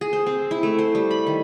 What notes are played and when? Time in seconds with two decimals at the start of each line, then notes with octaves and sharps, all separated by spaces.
0.01 G#4
0.13 C5
0.26 C4
0.51 E4
0.63 A3
0.78 C5
0.95 G3
1.11 B5
1.27 D#3